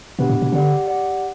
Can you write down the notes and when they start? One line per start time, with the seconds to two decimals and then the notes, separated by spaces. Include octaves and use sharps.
0.19 B2 B3 D4 G4 B4
0.29 A2
0.42 B2
0.52 D3 G4 D5 F#5
0.86 G4 D5 F#5